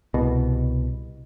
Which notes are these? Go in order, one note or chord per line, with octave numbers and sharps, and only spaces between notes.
C2 B2